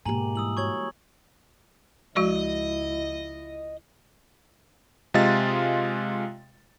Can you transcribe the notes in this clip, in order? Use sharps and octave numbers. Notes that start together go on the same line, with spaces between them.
G#2 B2 G#3 A#3 G4 G#5 A#5 F#7
E3 G3 E4 D#6 E6 F#7
F#4 C#5 C#6 G#6 F#7
C#2 F3 G#3 E4 F#4 D#5
C3 G#3 F4 D#5 F5 A6